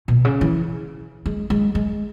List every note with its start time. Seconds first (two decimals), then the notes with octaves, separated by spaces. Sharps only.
0.08 B2
0.25 C#3
0.41 E3
1.26 G#3
1.50 G#3
1.75 G#3